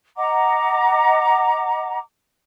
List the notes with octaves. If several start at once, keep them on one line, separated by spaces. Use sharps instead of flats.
D#5 F#5 A#5 D6